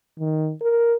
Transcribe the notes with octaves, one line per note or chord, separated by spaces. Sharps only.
D#3
A#4